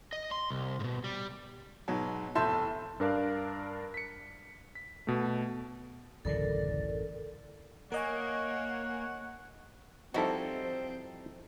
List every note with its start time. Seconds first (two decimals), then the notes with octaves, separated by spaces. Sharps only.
0.13 D#5
0.31 C6
0.50 C2
0.80 G#2 B2
1.04 G3
1.88 G#2 B2 F#3
2.35 F1 A2 E5 A5 C6 G6
3.00 G2 D4 A#4 D5 F5 F#6
3.94 B6 C#7
4.75 B6
5.07 B2 A3
6.25 D1 A1 F#2 C#3 E3 A4 A#4 D5
7.92 A#3 A#4 C#5 D#5 F#5 G#5
10.14 F3 G3 C4 D#4 E4 F#4 A4